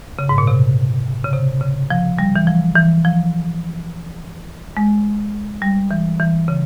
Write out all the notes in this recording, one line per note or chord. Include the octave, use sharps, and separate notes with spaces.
C#3
G#2
A#2
C3
C#3
C3
C#3
F3
G3
E3
F3
E3
F3
G#3
G3
E3
E3
C#3